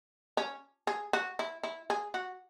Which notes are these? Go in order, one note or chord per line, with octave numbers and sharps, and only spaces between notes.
C#4
G#4
F#4
E4
E4
G#4
F#4